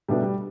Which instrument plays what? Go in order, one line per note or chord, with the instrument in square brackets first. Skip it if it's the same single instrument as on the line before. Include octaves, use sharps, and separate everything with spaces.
[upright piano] B2 A3 D4 G4 B4 [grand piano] G3
[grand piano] G3